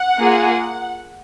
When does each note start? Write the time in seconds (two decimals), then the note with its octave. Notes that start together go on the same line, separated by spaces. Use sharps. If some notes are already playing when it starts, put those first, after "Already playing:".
Already playing: F#5
0.19 A#3 F4 G#4